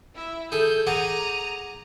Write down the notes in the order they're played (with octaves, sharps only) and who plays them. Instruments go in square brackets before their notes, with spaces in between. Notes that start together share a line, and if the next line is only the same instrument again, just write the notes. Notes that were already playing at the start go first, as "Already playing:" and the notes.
[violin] E4 E5
[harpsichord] G#4 A4 [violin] G6
[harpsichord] G#4 F#5 D6 [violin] A#5 D#7